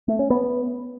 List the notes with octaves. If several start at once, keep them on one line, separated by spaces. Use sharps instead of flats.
A3
C#4
B3